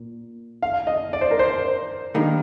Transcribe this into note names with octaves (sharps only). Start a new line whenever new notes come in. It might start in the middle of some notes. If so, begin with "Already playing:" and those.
Already playing: A#2
F5
D#5
D5
C5
A#4
C5
G2 D#3 A#3